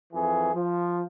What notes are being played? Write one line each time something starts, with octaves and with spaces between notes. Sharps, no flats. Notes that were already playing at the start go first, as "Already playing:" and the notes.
F2 E3 G#4
F3